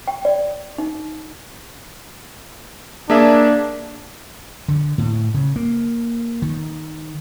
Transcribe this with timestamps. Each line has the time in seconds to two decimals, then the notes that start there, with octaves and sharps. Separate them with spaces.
0.08 G5
0.25 D5
0.78 D#4
3.10 A#3 D4 G#4 E5
4.68 D3
4.98 A2
5.34 C#3
5.56 A#3
6.42 D#3